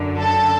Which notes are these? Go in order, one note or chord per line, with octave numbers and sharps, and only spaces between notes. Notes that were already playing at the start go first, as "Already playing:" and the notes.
Already playing: F#2 D3
A4